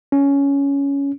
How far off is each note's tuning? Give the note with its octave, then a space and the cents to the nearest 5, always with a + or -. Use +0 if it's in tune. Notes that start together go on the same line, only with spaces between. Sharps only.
C#4 +10